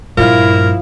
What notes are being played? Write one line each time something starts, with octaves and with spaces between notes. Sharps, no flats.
G2 A#2 F3 E4 A#4 F5